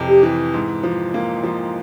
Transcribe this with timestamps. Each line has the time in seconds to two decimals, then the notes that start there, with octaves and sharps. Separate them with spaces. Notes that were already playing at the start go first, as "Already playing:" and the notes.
Already playing: F2 C3 E3
0.09 G4
0.23 E3
0.54 G#2
0.83 F3
1.14 A#3
1.43 F3